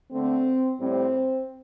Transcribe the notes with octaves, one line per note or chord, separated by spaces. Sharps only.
D3 A3 C4
A2 G3 C4